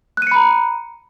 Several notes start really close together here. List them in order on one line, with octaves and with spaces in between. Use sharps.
F#6 D#7 C#7 B5 A#5